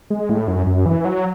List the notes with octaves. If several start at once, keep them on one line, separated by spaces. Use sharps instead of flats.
G#3
A2
F#2
F#2
E3
F#3